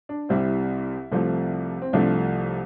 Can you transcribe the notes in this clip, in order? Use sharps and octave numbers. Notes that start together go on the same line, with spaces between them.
D4
C2 C3 G3 C4 E4
C2 C3 F3 A3
C4
C2 C3 F3 A3 D4